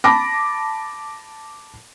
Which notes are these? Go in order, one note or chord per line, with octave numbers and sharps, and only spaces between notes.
A5 B5 D6 A#6